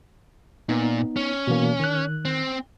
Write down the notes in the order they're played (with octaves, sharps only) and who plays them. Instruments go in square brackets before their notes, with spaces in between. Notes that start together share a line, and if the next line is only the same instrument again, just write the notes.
[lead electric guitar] A#2 [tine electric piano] B3 D#4
[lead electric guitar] C#4
[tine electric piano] B2 E3 A#3
D#3 F#6
[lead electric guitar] C4